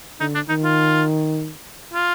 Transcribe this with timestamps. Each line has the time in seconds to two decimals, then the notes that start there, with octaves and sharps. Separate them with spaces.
0.20 D3 D#4
0.35 D4
0.49 D#3 D#4
0.64 F4
1.93 F4